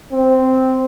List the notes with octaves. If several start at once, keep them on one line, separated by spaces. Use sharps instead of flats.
C4